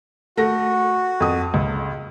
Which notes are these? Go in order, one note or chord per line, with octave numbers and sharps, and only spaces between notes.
A3 F#4 A#6
F2 D#6
C#2